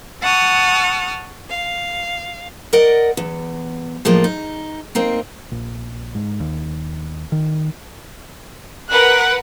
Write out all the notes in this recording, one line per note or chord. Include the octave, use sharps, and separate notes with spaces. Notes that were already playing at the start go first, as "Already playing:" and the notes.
F#5 A5 C#6 D#6 F6
F5
A#4 D5 D#5 F#5
E2
A2 F3 G#3 A#3
D#4
A#3 C4 D#4
A#1
G#2
D#2
D#3
A#4 B4 F#5 F#6